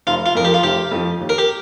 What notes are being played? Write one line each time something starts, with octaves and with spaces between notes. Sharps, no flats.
F1 F4
F4
F2 F3 A#4
G4
F4
F1 G4
F2 F3
D#2
A#4
G4